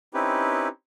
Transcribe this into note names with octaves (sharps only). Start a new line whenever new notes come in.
C4 C#4 D#4 E4 G4 B4